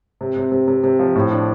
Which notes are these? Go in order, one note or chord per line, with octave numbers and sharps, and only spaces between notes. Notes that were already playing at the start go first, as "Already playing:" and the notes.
C3
C3
C3
C3
C3
F3
A2
D4